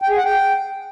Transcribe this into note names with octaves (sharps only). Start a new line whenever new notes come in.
G5
G#4
F#5
G5